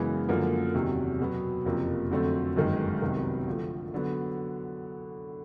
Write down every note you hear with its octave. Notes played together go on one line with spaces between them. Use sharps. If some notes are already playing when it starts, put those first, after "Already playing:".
Already playing: F#2 C#3 E3 G#3 B3
F#2 D3 F3 A#3
E2 C3 D#3 F#3
B2 F#3 B3
F#1 F2 C3 F3 A#3
F2 D3 F#3 A3 C4
G1 F#2 D#3 G#3
C2 C3 D#3 F#3 B3
D3 F3 A3
D3 F#3 B3